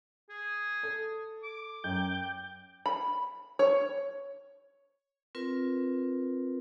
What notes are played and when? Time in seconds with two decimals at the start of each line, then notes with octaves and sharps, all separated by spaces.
0.30 G#4
0.83 A4
1.43 D6
1.84 F#2 G5 G6
2.86 B5
3.59 C#5
5.35 C4 F4 A#4 B4